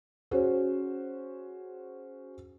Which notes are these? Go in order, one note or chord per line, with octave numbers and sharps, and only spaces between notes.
C#4 F#4 G#4 C5